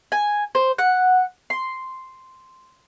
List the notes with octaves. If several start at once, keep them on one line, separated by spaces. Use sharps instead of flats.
G#5
C5
F#5
C6